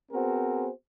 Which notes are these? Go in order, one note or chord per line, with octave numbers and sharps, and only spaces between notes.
B3 C4 F#4 G#4 A#4 C5